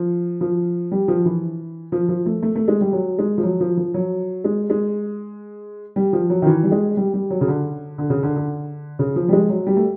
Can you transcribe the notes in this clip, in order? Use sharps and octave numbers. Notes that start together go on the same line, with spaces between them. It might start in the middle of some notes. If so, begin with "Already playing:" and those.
Already playing: F3
F3
G3
F3
E3
F3
F3
A3
A3
A3
G#3
G3
F#3
G#3
F3
F#3
F3
F3
F#3
G#3
G#3
G3
F3
F#3
D#3
E3
G3
G#3
G3
G3
F#3
C#3
D3
D3
C#3
D3
D3
C#3
F3
G3
G#3
F#3
G3
A3